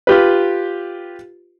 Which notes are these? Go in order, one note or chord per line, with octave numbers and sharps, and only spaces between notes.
F4 G4 B4